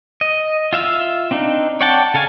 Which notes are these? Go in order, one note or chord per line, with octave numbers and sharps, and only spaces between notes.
D#5
F4 E5 F5 E6
C4 D4 D#4
C#5 D5 F#5 G5 A5
C#3 A4 F5 G#5